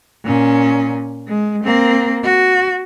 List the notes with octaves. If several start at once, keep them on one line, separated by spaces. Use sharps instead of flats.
A#2 C#4
G#3
A#3 C4
F#4